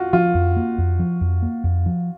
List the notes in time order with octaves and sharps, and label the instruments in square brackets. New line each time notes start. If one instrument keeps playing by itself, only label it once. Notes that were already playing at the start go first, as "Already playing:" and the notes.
Already playing: [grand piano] F4 F#4
[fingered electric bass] F3 [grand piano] F4
[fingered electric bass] F2
A#3
F2
F3
F2
A#3
F2
F3